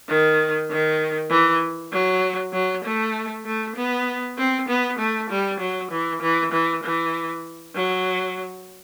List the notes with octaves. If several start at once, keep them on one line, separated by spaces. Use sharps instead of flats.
D#3
D#3
E3
F#3
F#3
A3
A3
B3
C4
B3
A3
G3
F#3
E3
E3
E3
E3
F#3